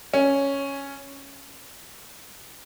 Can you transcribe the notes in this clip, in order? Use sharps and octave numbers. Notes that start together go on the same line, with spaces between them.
C#4